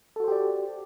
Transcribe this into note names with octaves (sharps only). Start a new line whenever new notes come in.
F#4 G4 A4 C5 D5